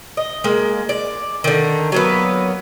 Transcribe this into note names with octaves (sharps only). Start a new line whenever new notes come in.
D#5
G#3 A#3
D5
D3 D#3
F#3 A#3 B3